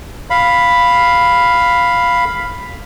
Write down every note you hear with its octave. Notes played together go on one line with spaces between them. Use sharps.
F5 B5